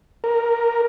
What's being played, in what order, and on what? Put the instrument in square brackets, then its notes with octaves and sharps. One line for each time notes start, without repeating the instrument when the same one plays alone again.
[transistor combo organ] A#4